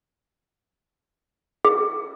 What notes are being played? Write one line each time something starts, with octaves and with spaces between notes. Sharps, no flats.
G#4